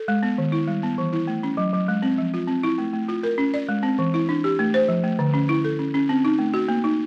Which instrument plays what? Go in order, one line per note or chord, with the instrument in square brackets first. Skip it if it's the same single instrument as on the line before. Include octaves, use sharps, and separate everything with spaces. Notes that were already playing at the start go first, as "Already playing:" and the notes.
Already playing: [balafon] A4
G#3
B3
D#3
E4
G3
B3
E3
E4
A3
C#4
F#3
F#3
G#3
C4
F3
F4
C4
E4
A3
A3
F4
A#4
C#4
D5
G#3
C4
E3
E4
D4
G4
A3
C5
F3
A3
D3
C#4
E4
A4
C#4
C#4
C4
D#4
A3
F#4
A#3
D#4